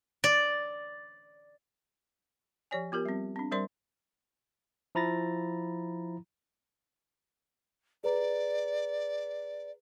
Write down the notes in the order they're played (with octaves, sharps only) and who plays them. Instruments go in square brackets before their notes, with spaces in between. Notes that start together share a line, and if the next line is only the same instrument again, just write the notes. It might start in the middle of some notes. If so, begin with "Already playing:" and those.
[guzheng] D5
[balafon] F3 G4 C#5 D5 G#5
B3 F4 G4 A#4
G3 C4
C4 D4
G3 A#4 C5 D5 C6
[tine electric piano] F3 E4 A#5 B5 A6 A#6
[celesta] G#4 B4 A#5 [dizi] D5